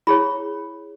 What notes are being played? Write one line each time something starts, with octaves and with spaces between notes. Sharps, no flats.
E4 G#4 C#5 B5